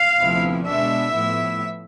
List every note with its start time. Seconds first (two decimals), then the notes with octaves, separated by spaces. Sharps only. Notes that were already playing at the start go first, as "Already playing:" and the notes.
Already playing: F5
0.20 D2 C3 F3 B3 E4
0.65 B2 G#3 B3 D4 E5
1.13 A2 F3 B3 E4